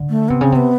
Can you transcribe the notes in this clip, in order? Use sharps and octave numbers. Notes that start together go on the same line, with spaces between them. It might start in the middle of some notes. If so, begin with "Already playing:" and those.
Already playing: D3
A3
C3 B3
C#3 C4
C3 B3